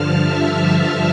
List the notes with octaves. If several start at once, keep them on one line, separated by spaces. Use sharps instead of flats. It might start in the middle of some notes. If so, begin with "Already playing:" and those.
Already playing: G2 D3 F3 A5 F6
E5